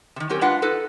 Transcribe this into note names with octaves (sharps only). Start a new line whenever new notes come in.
C3 D#3
F#3 C4 C#4 G4 A#4
G#3 D4 F4 B4 F5 F#5
D#4 A4 B4